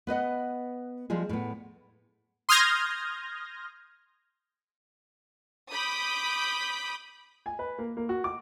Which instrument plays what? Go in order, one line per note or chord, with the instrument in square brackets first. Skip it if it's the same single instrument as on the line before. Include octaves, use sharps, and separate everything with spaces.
[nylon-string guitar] B3 B4 D#5 F#5
F3 G3 G#3 G#4
A2 B3
[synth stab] C6 D#6 F6 G6 G#6 A#6
[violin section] B5 D6 D#6 G6
[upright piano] G#5
B4
A#3
A#3
F#4
D6